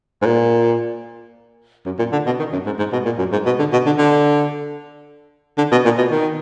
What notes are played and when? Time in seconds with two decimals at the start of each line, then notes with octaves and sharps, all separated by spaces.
0.22 G#2
0.26 A#2
1.86 F#2
1.98 A#2
2.12 D3
2.26 B2
2.39 D#3
2.53 F#2
2.66 G#2
2.79 G#2
2.92 B2
3.05 A#2
3.18 F#2
3.32 G#2
3.46 B2
3.58 D3
3.72 B2
3.86 D3
3.98 D3
5.58 D3
5.72 B2
5.85 A#2
5.98 B2
6.11 D#3